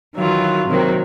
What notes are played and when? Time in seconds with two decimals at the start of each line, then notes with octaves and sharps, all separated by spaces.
0.16 D#3 E3 F#3 F4
0.68 C3 D#3 F#3 A#3 C4